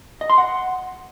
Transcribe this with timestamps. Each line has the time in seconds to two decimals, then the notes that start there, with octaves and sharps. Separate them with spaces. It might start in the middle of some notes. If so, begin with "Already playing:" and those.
0.21 D#5
0.29 C6
0.38 F#5